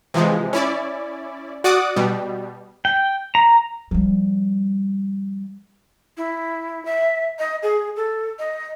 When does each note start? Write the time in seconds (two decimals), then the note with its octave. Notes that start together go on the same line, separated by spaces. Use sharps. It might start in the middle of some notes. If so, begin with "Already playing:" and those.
0.14 C3 E3 F3 G#3
0.53 C#4 E4 D5
1.64 F#4 D5 F#5 D6 D#6
1.96 B2 G3
2.85 G5
3.35 A#5
3.91 F3 G3
6.17 E4
6.85 E5
7.39 D#5
7.63 G#4
7.96 A4
8.39 D#5